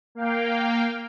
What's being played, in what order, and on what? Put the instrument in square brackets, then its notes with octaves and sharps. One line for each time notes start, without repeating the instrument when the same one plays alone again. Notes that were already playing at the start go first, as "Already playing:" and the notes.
[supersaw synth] A#3 F5 G5